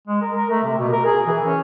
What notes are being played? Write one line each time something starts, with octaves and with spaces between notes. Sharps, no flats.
G#3
A#4
A#4
A3
C3
B2
A#4
G#4
E3
C#4